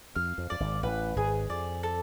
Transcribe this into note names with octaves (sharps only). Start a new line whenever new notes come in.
F2 F5
F2
F2 D5
G#1 G#2
A1 A2 B4
G#1 G#2 G#4
F2 D5
A4